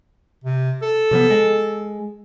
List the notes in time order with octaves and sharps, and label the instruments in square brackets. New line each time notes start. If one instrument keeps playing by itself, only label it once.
[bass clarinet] C3
A4
[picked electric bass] C3 F3 B3
G#3